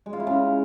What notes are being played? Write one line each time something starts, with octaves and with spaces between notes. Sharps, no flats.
G#3
F4
E4
C#3